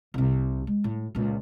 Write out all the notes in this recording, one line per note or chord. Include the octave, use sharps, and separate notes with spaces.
C2 C3
G#3
A2
C#2 A#2